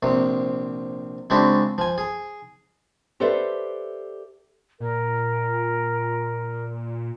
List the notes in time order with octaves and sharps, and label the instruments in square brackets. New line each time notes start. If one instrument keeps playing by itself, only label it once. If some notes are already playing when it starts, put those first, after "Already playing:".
[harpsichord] A#1 C3
C#3 G#3 C4 D4 E4 F#4
F3 G#5
G#4
[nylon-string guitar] G4 A4 B4 C5 D5 E5
[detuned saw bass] A#2 [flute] A#4